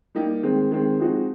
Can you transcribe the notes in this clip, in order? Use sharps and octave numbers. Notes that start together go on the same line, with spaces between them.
G3 A#3 D#4 G4
D#3 G#3 C4
D#3 G#3 C4
F3 G#3 C4 D#4 F#4